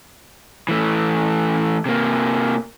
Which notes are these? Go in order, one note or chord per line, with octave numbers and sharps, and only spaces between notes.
E3 A3
C3 A#3